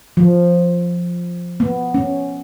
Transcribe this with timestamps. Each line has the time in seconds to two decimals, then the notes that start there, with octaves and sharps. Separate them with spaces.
0.17 F3
1.60 B3
1.94 C#4